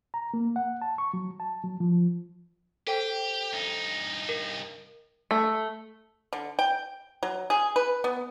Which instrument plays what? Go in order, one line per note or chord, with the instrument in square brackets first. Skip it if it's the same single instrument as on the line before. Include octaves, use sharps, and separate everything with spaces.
[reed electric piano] A#5
A#3
F#5
A5
C#6
F#3
A5
F#3
F3
[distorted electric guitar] G4 [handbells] A4 C5 G5
[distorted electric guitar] G2 D#4
[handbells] A#4
[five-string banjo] A3
[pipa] D3
G5
F#3
G#4
B4
B3